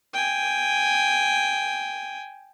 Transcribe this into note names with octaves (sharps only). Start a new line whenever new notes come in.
G5 G#5